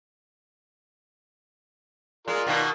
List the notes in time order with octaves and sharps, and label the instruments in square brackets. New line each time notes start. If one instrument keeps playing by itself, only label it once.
[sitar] G#3 [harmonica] F4 A#4 D5
[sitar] B2 D#3 A#3